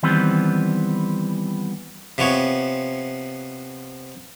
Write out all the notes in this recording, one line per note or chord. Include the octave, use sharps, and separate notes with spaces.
D#3 E3 G3 B3 C4
C3 F3 B3 C#5